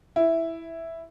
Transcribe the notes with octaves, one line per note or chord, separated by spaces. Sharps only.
E4